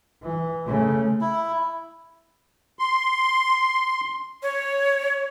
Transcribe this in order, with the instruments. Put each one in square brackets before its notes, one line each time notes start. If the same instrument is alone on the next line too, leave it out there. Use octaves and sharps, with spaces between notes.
[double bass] E3
C#3 A3
[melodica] E4
[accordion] C6
[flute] C#5